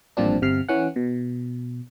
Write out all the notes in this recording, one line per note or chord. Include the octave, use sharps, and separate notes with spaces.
A1 G2 A#2 F3 C4 D4
G1 C3 F6 C7
E3 C#4 F#5
B2